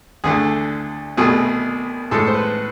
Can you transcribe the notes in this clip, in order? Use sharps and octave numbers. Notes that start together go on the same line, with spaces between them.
D2 D3 A3 G#4
C2 B2 A3 G#4
A2 G#3 A4
C5
B4